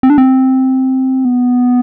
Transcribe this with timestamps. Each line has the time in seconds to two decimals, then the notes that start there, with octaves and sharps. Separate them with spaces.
0.03 C4
0.10 D4
0.18 C4
1.25 B3